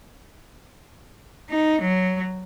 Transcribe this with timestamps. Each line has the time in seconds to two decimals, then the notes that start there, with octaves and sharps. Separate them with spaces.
1.50 D#4
1.81 F#3